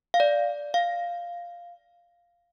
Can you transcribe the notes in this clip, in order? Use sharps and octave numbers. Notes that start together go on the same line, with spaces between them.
F5
D5
F5